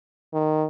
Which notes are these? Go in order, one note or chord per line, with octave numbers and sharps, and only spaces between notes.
D#3